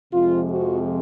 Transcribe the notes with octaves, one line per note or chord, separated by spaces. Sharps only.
F2 C3 F3 G#3 F4
F#4